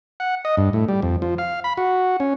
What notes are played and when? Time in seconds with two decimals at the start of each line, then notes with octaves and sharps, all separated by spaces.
0.20 F#5
0.45 D#5
0.57 G2
0.73 A2
0.88 G3
1.02 F2
1.22 F3
1.38 F5
1.64 B5
1.77 F#4
2.20 C#4